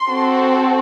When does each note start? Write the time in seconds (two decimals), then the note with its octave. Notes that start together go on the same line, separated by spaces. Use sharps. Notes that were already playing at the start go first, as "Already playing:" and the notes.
Already playing: C6
0.08 C4 F#4 A4